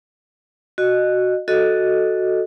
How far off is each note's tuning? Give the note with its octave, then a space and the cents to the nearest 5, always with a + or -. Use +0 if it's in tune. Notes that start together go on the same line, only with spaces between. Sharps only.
F#4 +0 D#5 -25
F#4 +0 A4 +0 D#5 +0